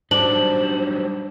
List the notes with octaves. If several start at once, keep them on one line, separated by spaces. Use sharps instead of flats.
F#3 G3 D4 D#4 C5 F#7